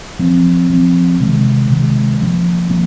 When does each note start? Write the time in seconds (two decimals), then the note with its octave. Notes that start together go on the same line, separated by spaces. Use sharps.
0.19 F3 C4
0.70 F3 C4
1.20 C3 D#3 G#3
1.70 C3 D#3 G#3
2.20 F3 A#3 C#4
2.70 F3 A#3 C#4